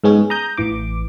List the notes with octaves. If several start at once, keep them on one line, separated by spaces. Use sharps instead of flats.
G#2 G#3 B3 C#4 G#4
A#5 D#6 G6
A1 E3 D6